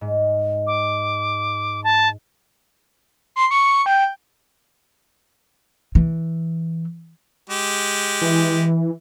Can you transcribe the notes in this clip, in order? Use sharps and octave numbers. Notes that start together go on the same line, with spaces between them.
G#2
D6
A5
C6
C#6
G5
E3
G#3 G4
E3